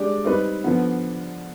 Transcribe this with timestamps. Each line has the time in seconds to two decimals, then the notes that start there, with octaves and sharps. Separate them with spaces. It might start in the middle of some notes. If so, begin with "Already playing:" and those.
Already playing: G#3 D4 G4 D5
0.24 G3 C4 D#4 B4
0.64 D3 F3 B3